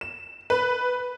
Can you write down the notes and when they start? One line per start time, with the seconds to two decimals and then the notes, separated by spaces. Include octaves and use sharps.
0.01 E7
0.50 B4